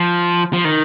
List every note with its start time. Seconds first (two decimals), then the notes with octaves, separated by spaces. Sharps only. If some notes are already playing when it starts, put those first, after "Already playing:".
Already playing: F3
0.53 F3
0.65 D#3